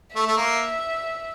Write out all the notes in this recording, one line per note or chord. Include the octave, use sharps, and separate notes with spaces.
A3 E5
A3
A#3